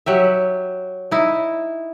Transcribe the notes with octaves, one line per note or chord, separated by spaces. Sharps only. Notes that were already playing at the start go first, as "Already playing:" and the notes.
F#3 G4 E5
D#4 E4